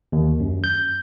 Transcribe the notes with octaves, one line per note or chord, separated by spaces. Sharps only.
D#2
F#2
G6